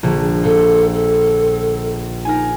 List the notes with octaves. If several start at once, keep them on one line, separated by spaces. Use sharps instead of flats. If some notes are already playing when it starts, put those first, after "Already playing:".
A#1 D3
A#2 A4
A4
D#4 A#4 G#5